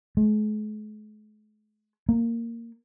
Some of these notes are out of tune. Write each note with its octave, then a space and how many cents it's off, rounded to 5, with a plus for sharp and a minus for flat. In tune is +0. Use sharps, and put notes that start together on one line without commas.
G#3 +45
A#3 -10